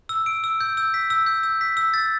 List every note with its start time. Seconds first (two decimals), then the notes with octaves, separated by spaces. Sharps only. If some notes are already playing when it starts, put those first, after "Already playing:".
0.09 E6
0.26 D7
0.44 E6
0.61 G6
0.77 E6
0.94 B6
1.10 E6
1.26 G6
1.43 E6
1.61 B6
1.77 E6
1.94 A6